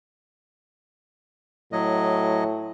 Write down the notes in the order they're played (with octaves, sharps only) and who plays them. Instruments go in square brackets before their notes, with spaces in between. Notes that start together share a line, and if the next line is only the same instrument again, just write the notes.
[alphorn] A2 [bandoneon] F#3 D#5